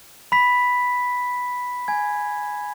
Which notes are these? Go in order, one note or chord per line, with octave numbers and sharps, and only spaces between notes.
B5 B6
G#5 G#6